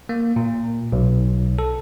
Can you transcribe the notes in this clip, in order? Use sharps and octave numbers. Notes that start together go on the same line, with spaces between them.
A#3
A#2
B1
A4